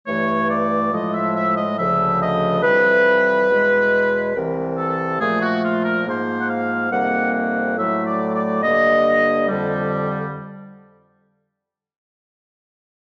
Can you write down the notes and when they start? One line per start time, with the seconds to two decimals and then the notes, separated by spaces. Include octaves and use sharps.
0.06 G2 E3 A3 C#5
0.49 D5
0.92 A2 F3 G#3 D#5
1.13 E5
1.35 E5
1.56 D#5
1.78 D2 C#3 F3 E5
2.20 D#5
2.63 F2 C3 E3 G3 B4
3.49 E2 B2 G#3
4.34 C2 C3 E3 A#4
4.77 A4
5.20 A#2 F3 A3 G#4
5.42 F#4
5.63 F4
5.85 A#4
6.06 G#2 F3 A#3 C5
6.40 F#5
6.49 F5
6.91 F2 C3 D#3 G3 A#3 F#5
7.34 F#5
7.77 A2 F#3 A3 E5
8.06 D5
8.34 D5
8.62 G2 D3 G3 A#3 D#5
9.48 F2 D3 G3